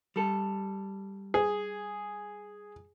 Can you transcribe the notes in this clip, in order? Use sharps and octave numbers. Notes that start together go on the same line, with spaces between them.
G3 A4
G#4